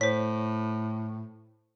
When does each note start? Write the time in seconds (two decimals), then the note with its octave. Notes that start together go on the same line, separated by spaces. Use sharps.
0.01 A2 C5 C#5 B6